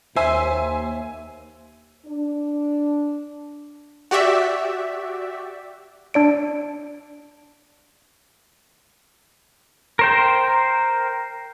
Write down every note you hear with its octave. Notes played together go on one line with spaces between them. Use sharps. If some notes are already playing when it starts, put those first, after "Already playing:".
D#2 C5 E5 G#5 E6
D4
F#4 G4 D5 E5
D4 D5 D7
A#4 C5 G5